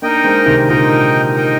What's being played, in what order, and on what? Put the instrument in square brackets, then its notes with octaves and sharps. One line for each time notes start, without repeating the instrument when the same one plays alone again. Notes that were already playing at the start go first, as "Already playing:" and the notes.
[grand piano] A#3 D4 [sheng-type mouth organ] D#4 A#4 D#5 G5
[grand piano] G#3 C4
C3 D#3
[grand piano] A#2 D3 [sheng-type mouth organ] D#4 A#4 D#5 G5
[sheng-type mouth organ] D#4 A#4 D#5 G5